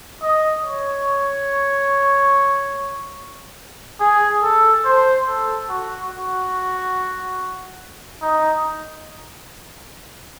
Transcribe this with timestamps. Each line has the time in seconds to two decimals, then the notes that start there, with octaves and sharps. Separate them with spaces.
0.22 D#5
0.65 C#5
4.00 G#4
4.43 A4
4.85 C5
5.27 A4
5.70 F#4
6.11 F#4
8.22 D#4